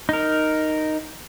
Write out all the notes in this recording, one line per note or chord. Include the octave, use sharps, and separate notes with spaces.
D#4 A#4